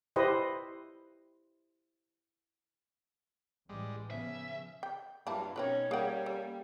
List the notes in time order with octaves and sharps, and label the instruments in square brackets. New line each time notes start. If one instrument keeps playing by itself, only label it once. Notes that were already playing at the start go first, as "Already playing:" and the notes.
[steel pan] E4 G4 B4 C5 D#5
[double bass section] A1 E3 [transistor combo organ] G3 G#3
[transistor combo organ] C#3 [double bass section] F3 B3 [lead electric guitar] E5
[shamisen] G5
[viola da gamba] G2 F#3 F4 [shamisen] A#3 E4 A5
[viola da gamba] B2 C#4 D#4 [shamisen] C4 A#4 B4 [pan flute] C#5
[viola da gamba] G3 C#4 G4 [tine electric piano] A#3 G5 [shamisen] G#4 F#5
[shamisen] A4